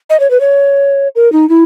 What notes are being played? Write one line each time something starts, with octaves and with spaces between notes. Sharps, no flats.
D#5
C#5
B4
C#5
A#4
D#4
E4